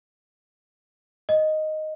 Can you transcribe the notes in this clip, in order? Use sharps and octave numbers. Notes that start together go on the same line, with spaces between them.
D#5